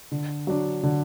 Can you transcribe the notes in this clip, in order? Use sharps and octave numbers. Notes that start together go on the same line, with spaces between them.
D3
F#3 D4
D3